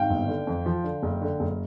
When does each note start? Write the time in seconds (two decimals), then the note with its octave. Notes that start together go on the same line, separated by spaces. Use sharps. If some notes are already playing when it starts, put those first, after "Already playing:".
Already playing: G#1 F5 G5
0.10 G1
0.28 D3
0.47 F2
0.66 F3
0.84 D3
1.03 F#1
1.22 D3
1.40 F#1